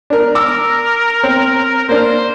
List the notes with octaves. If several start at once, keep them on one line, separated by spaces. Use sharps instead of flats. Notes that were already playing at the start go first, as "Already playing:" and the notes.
D4 A#4
A#4 D6 E6
C4
A#3 D4 C5